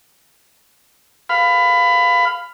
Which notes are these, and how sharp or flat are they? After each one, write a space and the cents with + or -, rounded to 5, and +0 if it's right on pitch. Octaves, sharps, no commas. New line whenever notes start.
F5 +0 B5 +20